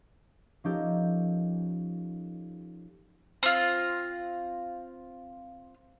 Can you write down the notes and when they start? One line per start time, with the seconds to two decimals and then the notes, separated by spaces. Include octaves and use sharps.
0.64 F3 C#4 D#4 G4 A4 A#4
3.43 C4 F4